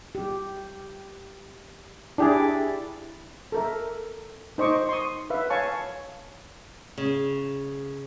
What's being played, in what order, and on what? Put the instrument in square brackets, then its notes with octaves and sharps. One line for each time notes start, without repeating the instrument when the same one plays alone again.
[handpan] G4
[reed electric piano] D4 G4 G#4 [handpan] E4 D5
[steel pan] A4 A#4 E5
D#4 C5 D#5 C#6 D6
C6 C#6 D#6
B4 E5 F5
C#5 F5 G#5 A5 C#6
[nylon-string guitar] C#3